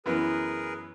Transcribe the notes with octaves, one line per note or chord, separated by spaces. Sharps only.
F#2 E3 B3 G#4 A#4 B4